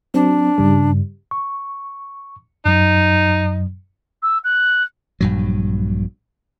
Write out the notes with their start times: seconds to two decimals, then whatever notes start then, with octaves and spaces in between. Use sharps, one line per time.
0.14 F#3 C4 D4
0.58 G2 C#3 G3
1.31 C#6
2.66 F#2 F#3 D#4
4.22 E6
4.44 F#6
5.21 A#1 G2 F#3